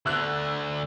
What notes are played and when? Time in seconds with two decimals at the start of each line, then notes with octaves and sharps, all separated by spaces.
0.06 D2 D3 E6 F#6